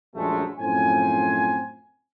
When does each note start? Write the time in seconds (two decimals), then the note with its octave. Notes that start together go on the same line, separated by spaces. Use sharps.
0.15 A#1 F#2 G#3 A3
0.60 F#2 A2 F3 C4 C5 G#5